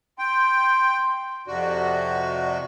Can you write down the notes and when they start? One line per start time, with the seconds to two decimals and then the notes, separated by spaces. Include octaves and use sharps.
0.19 G5 C6
1.47 F2 C3 F#4 D5